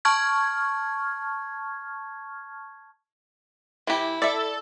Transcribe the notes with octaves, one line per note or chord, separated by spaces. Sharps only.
A5 C#6 F6 G#6
E3 E4 G4
A4 D5 E5